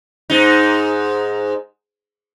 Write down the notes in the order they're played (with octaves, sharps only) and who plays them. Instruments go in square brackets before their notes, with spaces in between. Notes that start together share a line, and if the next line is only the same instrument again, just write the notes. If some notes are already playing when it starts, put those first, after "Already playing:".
[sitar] G#2 D#4